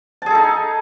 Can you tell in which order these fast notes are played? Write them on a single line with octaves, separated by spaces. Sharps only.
A5 G#4 A4 D#4